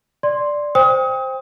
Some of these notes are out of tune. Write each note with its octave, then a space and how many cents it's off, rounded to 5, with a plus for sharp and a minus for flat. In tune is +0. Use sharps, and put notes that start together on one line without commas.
D5 +0 C6 +5
C5 +0 G5 +25 D#6 +30